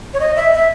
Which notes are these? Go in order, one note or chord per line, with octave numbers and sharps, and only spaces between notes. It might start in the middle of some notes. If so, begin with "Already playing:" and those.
C#5
D#5
E5
E5